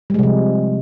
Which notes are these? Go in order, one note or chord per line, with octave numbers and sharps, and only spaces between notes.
C3 F3 G3 G#3